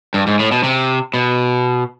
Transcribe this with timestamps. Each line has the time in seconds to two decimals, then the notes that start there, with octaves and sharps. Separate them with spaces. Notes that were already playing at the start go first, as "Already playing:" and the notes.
0.14 G2
0.27 G#2
0.40 A2
0.52 B2
0.64 C3
1.14 B2